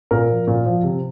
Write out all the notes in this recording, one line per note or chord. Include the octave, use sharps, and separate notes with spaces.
A#2 A#4
F3
A#2
F3
C3